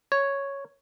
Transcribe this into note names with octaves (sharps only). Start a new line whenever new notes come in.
C#5